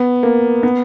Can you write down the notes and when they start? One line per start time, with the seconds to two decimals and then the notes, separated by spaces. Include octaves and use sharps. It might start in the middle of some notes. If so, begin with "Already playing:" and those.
Already playing: B3
0.23 A#3
0.63 B3